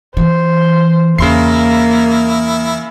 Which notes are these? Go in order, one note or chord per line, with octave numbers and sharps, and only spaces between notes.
E3 C5
E2 C#3 A#3 E4 C6 C7